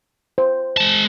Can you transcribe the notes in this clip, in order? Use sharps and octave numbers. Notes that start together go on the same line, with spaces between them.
C5
G#3 A5